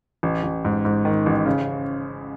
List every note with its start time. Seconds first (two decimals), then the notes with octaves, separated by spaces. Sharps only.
0.23 A1
0.43 A1
0.65 G#2
0.85 G#2
1.05 D#3
1.26 A1
1.46 C#3